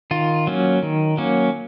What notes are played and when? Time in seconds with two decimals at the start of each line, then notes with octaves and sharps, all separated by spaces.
0.11 D#3 F4
0.47 F#3 A#3 C#4
0.83 D#3
1.17 F#3 A#3 C#4